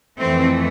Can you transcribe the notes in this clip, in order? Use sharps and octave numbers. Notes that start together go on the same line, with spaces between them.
F2 E3 A3 C4